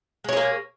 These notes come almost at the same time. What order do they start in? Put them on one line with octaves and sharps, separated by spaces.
G#3 C#5 G#4 A#3